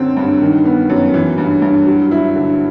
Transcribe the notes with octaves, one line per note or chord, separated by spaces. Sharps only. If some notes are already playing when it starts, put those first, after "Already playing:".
Already playing: F#2 D3 C4
G2
D#3
B3
F#2
E3
G2
G2
F#3
E4
D3